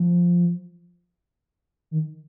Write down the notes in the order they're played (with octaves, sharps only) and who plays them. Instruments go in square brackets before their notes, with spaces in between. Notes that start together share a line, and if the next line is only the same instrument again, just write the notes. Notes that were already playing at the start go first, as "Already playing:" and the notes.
Already playing: [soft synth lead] F3
D#3